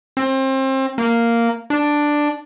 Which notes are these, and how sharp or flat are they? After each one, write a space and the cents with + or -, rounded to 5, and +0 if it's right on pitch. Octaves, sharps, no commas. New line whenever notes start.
C4 +30
A#3 -5
D4 +5